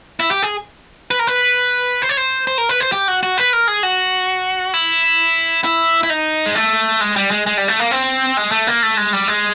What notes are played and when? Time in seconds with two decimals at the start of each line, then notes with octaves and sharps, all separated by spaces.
0.20 E4
0.31 G4
0.43 G#4
1.11 B4
1.19 A#4
1.27 B4
2.02 C5
2.09 C#5
2.17 C5
2.47 C5
2.58 A#4
2.69 B4
2.80 C5
2.92 G4
3.08 F#4
3.23 F#4
3.38 B4
3.53 A#4
3.68 G#4
3.83 F#4
4.74 E4
5.64 E4
6.03 E4
6.10 D#4
6.46 G#3
6.55 A3
7.01 G#3
7.16 G3
7.31 G#3
7.47 G#3
7.57 G3
7.68 A3
7.80 A#3
7.91 C4
8.37 G#3
8.51 A3
8.67 A#3
8.83 A3
8.97 G#3
9.13 G3
9.28 G#3